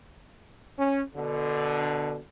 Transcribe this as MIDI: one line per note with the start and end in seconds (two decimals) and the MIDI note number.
0.78 1.01 61
1.15 2.17 47
1.15 2.17 50